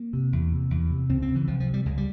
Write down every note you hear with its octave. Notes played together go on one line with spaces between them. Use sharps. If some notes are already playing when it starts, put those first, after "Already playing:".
Already playing: A#3
C3
E2
C3
E2
C3
C#2 C4
C4
C#3
E3
C2 F3
F3
C3
G3
C#2 G#3
G3